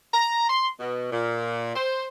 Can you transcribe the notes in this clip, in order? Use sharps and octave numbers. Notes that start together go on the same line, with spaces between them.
A#5
C6
B2
A#2
C5